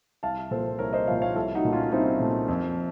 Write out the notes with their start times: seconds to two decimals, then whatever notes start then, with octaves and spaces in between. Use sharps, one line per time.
0.23 C2 F5 A5
0.51 A#2 F3 A4 C5
0.79 C2 A#4 C#5
0.93 C5 D#5
1.07 A#2 F3 C#5 F5
1.22 C#5 F5
1.35 C2 F4 A4
1.55 D#4 F#4
1.64 A#2 A3
1.73 C#4 F4
1.92 C2 C4 D#4
2.20 A#2 A3
2.48 F2